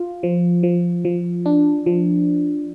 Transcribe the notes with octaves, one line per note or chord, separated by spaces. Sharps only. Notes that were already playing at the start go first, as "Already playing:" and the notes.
Already playing: F4
F3
F3
F3
D4
F3